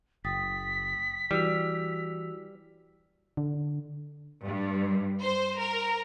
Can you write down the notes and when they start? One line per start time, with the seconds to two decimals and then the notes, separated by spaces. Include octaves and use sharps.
0.25 F#1 G5 D#6 A6 B6
1.31 E3 G3 F#4 E6 F7
3.37 D3
4.45 G2
5.22 C5
5.58 A#4